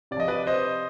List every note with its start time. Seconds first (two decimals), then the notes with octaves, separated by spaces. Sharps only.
0.11 C3 D5
0.17 F3 D#5
0.28 B4 D5
0.47 C5 D#5